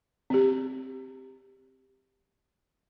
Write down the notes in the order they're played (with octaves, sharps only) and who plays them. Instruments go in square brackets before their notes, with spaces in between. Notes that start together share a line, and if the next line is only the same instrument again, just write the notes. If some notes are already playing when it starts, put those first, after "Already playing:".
[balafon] C4 G4